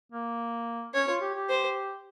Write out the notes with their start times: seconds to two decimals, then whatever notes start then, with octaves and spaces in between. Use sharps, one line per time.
0.12 A#3
0.94 C#4 C#5
1.08 F4
1.21 G4
1.35 G4
1.49 C5